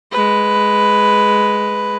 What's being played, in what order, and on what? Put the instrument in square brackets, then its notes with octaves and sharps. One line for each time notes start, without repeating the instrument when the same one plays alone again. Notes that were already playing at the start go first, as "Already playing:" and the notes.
[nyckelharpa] G#3 B4